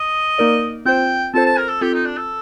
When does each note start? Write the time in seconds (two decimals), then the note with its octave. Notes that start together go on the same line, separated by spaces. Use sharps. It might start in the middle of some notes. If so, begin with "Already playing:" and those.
Already playing: D#5
0.38 A#3 D#4 A#4 D5
0.85 C4 F4 C5 G5
1.34 C4 F4 A4 C5 A5
1.46 A5
1.58 A#4
1.69 A4
1.81 C4 F4 G4 A4
1.94 D#4
2.05 D4
2.17 A4